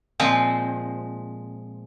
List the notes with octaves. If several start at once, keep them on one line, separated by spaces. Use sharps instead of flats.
A#2 F3 G#3 C4